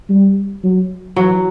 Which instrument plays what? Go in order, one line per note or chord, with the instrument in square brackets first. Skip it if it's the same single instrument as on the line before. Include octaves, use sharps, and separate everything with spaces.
[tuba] G3
F#3
[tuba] E3 [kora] F#3